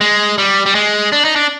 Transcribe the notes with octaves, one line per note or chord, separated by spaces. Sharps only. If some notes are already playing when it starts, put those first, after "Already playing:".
G#3
G3
G3
G#3
D4
D#4
D4